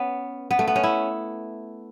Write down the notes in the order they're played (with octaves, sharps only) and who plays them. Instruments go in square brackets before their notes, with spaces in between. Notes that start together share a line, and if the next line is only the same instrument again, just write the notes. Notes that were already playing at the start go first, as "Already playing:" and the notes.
Already playing: [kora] B3 C#4
B3
A3
B3
C#4
E4